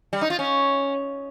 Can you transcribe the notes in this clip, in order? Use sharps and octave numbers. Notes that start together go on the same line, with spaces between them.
G3
D#4
F4
C#4